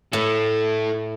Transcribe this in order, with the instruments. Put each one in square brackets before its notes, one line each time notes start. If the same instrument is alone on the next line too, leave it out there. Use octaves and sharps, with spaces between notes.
[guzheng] A2 [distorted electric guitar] E4 A4